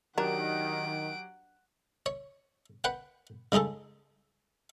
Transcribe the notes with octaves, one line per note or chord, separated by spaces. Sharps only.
D#3 F#3 D4 G4 A#4 F#5 F#6 D7
C#5
B4 F#5 G5
C#3 G#3 D#4 G#4 A4